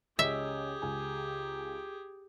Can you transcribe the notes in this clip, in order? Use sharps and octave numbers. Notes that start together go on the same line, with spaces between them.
C#2 C#4 G4 G#4 D#5 E5
C#2 G#5